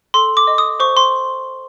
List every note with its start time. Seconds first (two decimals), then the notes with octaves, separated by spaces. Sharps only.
0.14 A4 C6
0.37 D6
0.47 D#5
0.58 D#6
0.80 C5 C#6
0.97 C6